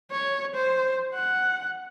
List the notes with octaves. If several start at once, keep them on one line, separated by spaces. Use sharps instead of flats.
C#5
C5
F#5